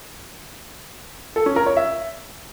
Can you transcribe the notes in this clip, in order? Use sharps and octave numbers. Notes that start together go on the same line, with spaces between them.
A4
C#4
A#4
C#5
E5